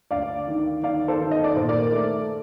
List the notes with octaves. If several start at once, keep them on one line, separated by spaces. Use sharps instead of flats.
D2 D5 F5
D#3
D#3 D5 F5
A4 C5
D#3
D#5
D5
A#2 C5
A#4 D5
A3